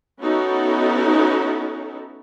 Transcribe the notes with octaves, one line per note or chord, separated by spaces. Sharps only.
B3 C#4 D#4 E4 F#4 A4